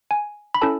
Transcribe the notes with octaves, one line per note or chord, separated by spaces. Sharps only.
G#5
B5
C#4 E4 A4 A5